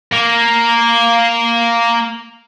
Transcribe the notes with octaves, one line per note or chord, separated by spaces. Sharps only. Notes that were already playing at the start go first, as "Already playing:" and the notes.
A#3 A#4